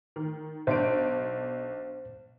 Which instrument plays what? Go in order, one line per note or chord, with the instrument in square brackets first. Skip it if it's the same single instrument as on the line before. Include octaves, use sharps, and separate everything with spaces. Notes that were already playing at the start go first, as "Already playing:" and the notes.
[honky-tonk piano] D#3
[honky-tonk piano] B1 D4 D7 [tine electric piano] C5